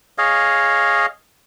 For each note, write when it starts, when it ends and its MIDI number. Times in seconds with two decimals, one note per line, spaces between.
0.18 1.06 68
0.18 1.06 73
0.18 1.06 75
0.18 1.06 77